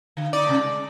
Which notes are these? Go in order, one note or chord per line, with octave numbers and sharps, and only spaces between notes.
D3
D#4 D5
C3 A3
G#3